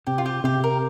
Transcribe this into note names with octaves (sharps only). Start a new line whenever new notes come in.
C3 G4
F4
G4
C3 G4
A#4